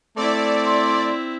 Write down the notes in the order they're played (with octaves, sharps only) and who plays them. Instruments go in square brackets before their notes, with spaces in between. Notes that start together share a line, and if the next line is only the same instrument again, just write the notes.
[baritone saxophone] A3 [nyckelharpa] C4 E4 [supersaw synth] D5
[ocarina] C6